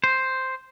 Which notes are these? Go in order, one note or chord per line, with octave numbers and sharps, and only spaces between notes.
C5